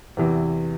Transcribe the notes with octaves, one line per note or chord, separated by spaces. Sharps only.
E2 C3 E3